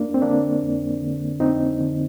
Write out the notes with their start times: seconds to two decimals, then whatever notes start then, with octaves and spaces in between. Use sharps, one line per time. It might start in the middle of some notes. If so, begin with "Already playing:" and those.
Already playing: F2 A#3 D4
0.14 C4
0.22 D3 A#3 D4
0.62 F2
1.01 D3
1.40 F2 C4 D#4
1.81 D3